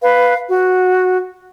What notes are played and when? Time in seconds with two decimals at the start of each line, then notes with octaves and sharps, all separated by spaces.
0.02 B4 F5
0.50 F#4